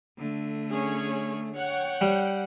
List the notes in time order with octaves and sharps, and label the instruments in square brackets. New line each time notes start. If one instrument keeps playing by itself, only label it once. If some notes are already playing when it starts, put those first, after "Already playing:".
[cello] D3 A3
[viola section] C#4 G#4 C#5
[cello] C#5 [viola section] F#5 G5
[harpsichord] G3